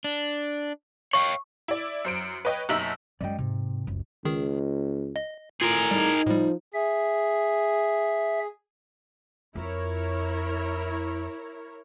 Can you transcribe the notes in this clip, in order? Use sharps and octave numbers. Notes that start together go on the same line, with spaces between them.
D4
C#5 F5 G5 C#6
E4 D5
F#2 C5 D7
B4 C#5 D#5 G5
F#1 B2 D#4 E5 E6 F#7
F#2 G#3 D5 D#5 G5
G#2 C3
F#1 C#2
C#2 D#3 G#4
D#5
A2 F4 G#4 A#4
G3 D#4
A2 F3 G3
G#4 E5
F2 E4 F4 A#4 C#5